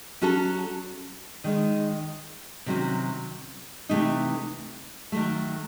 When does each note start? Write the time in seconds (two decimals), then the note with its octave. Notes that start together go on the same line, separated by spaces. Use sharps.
0.21 F#3 C#4 F#4 A4
1.44 D#3 G#3 D#4
2.66 C3 D#3 F#3 C#4 F#4
3.89 C3 E3 A3 D#4
5.12 D#3 F#3 A3